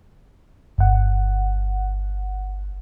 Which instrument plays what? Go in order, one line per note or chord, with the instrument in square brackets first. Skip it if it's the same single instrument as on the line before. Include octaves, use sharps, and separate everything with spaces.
[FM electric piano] G1 F#5